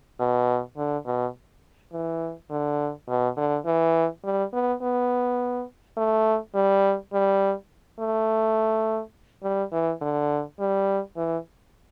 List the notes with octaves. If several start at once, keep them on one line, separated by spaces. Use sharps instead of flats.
B2
D3
B2
E3
D3
B2
D3
E3
G3
B3
B3
A3
G3
G3
A3
G3
E3
D3
G3
E3